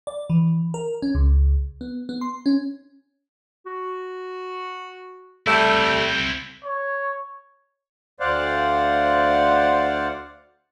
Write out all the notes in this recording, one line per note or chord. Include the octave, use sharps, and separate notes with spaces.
D5
E3
A#4
C#4
C#2
B3
B3
C6
C#4
F#4
G3 A3 C4 E4
C#5
D2 C5 D5 F5 F#5